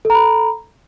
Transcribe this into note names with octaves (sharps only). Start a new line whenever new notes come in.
A4 A#5 B5